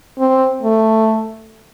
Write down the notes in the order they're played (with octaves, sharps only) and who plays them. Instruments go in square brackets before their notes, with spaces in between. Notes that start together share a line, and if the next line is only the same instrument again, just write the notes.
[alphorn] C4
A3